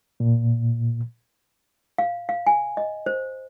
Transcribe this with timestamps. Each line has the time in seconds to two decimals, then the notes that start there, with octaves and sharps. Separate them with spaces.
0.20 A#2
1.98 F5
2.29 F5
2.47 G#5
2.77 D#5
3.06 C5